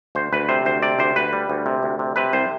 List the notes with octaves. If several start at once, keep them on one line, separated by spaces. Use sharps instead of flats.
D2 C5
D2 B4
C3 C5
D2 C5
C3 D5
D2 C5
D2 B4
G3
D2
C3
D2
C3
C3 B4
C2 C5